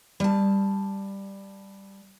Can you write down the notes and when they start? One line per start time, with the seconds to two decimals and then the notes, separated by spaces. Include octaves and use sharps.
0.20 G3 A5